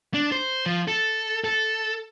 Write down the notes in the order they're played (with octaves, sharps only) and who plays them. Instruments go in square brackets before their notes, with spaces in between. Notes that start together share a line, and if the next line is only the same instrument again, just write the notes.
[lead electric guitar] D4
C5
F3
A4
A4